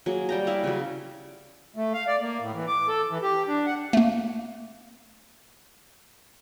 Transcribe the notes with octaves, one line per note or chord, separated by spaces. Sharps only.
F#3 A#3 G#4
G3 G5 A#5
E4 D5 E5 F5
C#3 F#3
A3
F5
D5
A#3
A2
E3
D6
A4
E3
G4
D4
F#5
A3 A#3